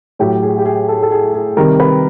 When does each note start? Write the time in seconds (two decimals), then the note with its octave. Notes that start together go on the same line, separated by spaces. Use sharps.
0.19 A2 F#3 G4
0.42 G#4
0.58 G4
0.65 G#4
0.88 A4
1.02 A4
1.11 G#4
1.34 G#4
1.57 C3 D#3 G3 A#4
1.80 B4